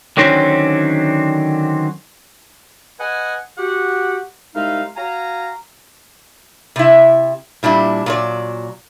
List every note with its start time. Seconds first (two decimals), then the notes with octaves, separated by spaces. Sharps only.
0.17 D3 D#3 F#3 C4 C#4
2.99 B4 D#5 F#5 G#5
3.57 F#4 G4 F#5
4.55 C2 G#3 D#4 E5 F5
4.96 F#4 F5 G#5 A#5
6.76 C3 E4
7.63 A#2 G3 D4 E4
8.06 A#2 F#3 D5